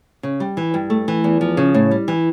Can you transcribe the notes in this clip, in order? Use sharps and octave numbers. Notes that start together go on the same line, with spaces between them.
C#3
G3
E3
G2
A3
E3
E2
F3
C#3
A2
G3
E3